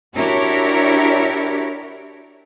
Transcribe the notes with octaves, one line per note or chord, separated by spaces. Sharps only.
D4 E4 F#4 G4 A#4 C#5